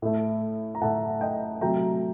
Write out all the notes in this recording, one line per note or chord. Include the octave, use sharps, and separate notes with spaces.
A2 A3
A#5
A2 A3 F#5 A5
D#5 G5
C3 F#3 A3 G5 A#5